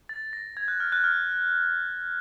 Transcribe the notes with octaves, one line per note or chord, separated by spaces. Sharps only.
A6
A#6
G#6
F#6
F6
F#6
F6